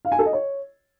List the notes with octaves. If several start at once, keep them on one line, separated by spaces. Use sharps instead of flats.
F5
G#5
A4
D#5
C#5